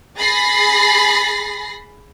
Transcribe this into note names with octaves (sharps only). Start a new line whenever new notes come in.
G#4 B5 A6 A#6 C7